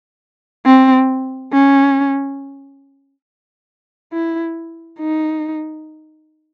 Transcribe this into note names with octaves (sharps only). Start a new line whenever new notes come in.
C4
C#4
E4
D#4